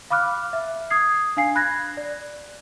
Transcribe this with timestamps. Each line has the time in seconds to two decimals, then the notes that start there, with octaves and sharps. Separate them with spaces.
0.10 F5 B5 D6 F6 F#6
0.53 E5
0.90 D#6 G#6 C7
1.37 D4 F5 G#5 C7
1.55 B5 F#6 G#6 A#6
1.97 D5